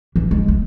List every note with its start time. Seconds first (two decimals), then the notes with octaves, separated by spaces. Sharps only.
0.16 E3
0.31 G#3
0.48 A3